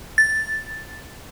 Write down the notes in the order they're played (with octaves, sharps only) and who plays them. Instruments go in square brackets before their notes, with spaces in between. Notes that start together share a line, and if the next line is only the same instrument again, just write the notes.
[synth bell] A6